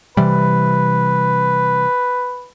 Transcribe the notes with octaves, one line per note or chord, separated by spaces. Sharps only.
C3 E3 G3 B4